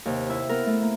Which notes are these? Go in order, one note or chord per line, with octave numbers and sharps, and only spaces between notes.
D#2 C3
E4
B3 A#4
A3
A#3